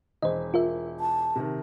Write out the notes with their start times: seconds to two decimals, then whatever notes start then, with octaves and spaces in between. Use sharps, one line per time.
0.22 E1 C5 D#5
0.54 F4 A#4 E5
1.00 A5
1.36 C3 D#3